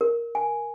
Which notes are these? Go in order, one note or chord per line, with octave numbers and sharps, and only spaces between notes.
A#4
G#5